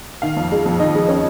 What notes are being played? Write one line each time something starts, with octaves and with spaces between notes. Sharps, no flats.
D#3 F5
F2
G#3
F2
D#3 D#5
G#3
C#4